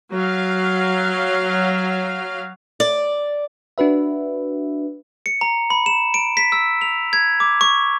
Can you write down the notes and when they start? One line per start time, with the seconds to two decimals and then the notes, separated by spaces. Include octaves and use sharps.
0.12 F#3 F5
2.80 D5
3.78 D4 F#4 B4 E5
5.26 C#7
5.41 A#5
5.70 B5
5.86 E7
6.14 D7
6.37 B6
6.52 E6
6.81 F7
7.13 G#6
7.40 D6
7.61 C#6